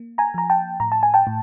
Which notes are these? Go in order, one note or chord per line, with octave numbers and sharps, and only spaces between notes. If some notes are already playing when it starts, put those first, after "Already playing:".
Already playing: A#3
G#5 A#5
F3 A#5
G5 A5
A2 A#5
A5
G#5
G5 A5
A2